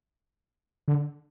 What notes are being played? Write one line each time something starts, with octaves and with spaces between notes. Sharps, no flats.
D3